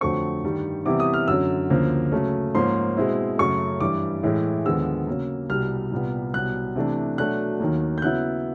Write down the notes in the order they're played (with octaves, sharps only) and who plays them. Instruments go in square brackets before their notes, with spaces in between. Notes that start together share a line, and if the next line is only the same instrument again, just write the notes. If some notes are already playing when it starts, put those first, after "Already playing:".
[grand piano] F2 D3 F#3 A3 C4 C#6
G2 D#3 G3
C3 E3 G3 B3 E4 D6
D#6
F6
F#2 D3 F#3 E6
D2 C#3 F3 A#3
C#3 F#3 A3
G#2 F3 A#3 C#4 C6
B2 G#3 C4 E4
F#2 C#3 F#3 A3 C#6
G2 E3 G3 D6
A2 E3 G#3
D#2 D3 F3 G#3 B3 E6
C#3 F#3 A#3
C2 B2 G3 F6
C2 A#2 G3 B3
C2 B2 F#3 B3 F#6
C3 E3 A3 D4
B2 F#3 A3 D4 F#6
D#2 D#3 F#3 A#3
G6
C#3 F#3 B3 E4 F#6